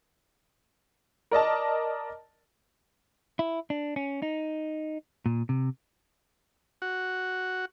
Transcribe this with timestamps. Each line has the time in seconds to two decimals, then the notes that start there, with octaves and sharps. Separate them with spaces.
1.31 A#4 D5 D#5 A5
3.39 E4
3.70 D4
3.96 C#4
4.22 D#4
5.26 A#2
5.49 C3
6.82 F#4